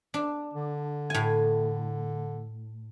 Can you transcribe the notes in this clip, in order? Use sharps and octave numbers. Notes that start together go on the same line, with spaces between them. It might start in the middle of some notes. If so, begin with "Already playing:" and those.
D4
D3
A2 G#5